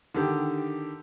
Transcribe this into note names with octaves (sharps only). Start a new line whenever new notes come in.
D3 D#3 G4